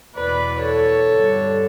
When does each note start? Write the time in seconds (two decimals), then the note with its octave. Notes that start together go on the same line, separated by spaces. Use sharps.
0.17 E2 B2 B4 D5
0.63 A4 C#5
1.09 G2 D3